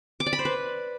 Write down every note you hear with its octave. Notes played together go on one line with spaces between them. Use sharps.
D6
D5
B5
C5
B4